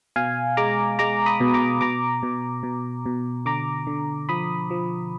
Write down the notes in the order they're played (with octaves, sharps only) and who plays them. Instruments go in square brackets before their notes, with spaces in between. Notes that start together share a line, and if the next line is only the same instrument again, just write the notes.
[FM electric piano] B2 F5 G#5
G#3 A#5 D6
G#3 A#5 D6
B5 D#6
B2
A#5 D6
B2 A#5 D6
B2
B2
B2
D3 A#5 D6
D3
F3 B5 D#6
F3